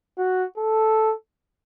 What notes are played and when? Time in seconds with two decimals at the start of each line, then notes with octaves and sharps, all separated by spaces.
0.18 F#4
0.58 A4